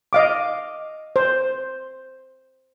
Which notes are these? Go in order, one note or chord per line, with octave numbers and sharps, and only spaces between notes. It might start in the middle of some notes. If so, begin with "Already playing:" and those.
D#5 F5 D6
C5